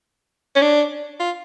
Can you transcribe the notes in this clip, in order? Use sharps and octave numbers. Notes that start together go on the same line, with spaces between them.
C#4
D4
F4